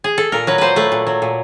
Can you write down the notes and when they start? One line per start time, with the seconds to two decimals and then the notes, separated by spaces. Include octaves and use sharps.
0.04 G#4
0.18 A4
0.32 A#2 A#4
0.47 F#3 B4
0.58 A#2 B4 C5
0.76 A3 B4
0.92 A#2
1.07 F#3
1.22 A#2